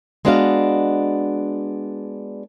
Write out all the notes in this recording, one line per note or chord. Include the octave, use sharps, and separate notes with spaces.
G#3 B3 D4 F#4 D#5 F5